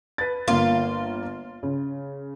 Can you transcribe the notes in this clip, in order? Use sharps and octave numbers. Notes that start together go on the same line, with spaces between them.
B4 A6
G1 A#3 F4
C#3